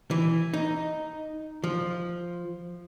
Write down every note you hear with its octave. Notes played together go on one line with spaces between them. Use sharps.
E3
D#4
F3